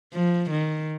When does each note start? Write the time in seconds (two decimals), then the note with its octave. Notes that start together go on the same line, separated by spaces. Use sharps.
0.13 F3
0.51 D#3